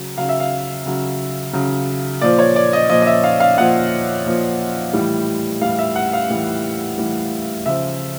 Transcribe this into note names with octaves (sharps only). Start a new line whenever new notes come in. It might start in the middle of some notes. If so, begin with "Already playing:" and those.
Already playing: C#3 F#3
C#3 F#3 F5
E5
F5
C#3 F#3
C#3 F#3
A#2 F3 D5
C#5
D5
D#5
A#2 F3 D#5
D#5
E5
F5
F5
A#2 F3 F#5
A#2 F3
A2 E3 G3
A2 E3 G3 F5
E5
F#5
F5
A2 E3 G3
A2 E3 G3
C#3 F3 E5